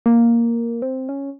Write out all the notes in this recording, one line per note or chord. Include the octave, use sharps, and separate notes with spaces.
A#3
C4
C#4